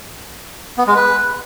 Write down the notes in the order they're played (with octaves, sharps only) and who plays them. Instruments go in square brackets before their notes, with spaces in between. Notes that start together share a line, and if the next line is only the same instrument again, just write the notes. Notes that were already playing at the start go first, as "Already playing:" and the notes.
[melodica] B3
G#3
B4